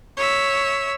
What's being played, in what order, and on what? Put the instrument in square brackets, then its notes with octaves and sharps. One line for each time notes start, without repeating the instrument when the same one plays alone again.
[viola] C#5 E5